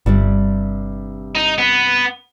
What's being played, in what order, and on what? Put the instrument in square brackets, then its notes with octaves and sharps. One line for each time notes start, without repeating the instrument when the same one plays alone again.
[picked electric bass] G1 [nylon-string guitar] G2 C3 G3
[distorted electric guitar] D#4
B3